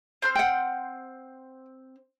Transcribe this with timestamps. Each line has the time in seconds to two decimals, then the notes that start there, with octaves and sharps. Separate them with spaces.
0.22 C4 C5 F6
0.35 F#5 G5